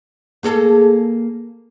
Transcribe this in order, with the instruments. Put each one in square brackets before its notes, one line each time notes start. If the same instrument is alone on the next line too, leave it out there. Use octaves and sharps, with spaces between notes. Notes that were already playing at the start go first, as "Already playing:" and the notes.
[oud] A#3 G#4 A4